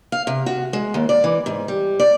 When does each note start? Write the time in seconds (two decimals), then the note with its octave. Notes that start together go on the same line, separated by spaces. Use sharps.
0.12 F5
0.27 C3
0.46 F#4
0.73 G#3
0.94 D#2
1.09 D5
1.24 E3
1.46 G#2
1.68 G3
2.00 D5